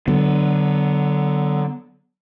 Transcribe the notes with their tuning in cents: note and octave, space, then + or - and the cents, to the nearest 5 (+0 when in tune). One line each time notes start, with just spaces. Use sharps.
D3 +0 F#3 +25 B3 +0